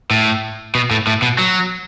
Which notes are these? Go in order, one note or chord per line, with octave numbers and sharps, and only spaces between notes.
A2
B2
A2
A2
B2
F#3